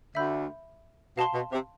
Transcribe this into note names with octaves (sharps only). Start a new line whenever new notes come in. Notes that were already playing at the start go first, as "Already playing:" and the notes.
D2 D3 E5 B5 E6 G6
B2 F5 A5 C6
B2
C3